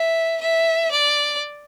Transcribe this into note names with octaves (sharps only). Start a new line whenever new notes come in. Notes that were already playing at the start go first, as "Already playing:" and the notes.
Already playing: E5
E5
D5